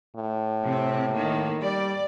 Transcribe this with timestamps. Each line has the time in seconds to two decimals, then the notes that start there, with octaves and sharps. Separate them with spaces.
0.16 A2
0.64 C3 C4
1.13 D#3 A#3
1.62 G3 D5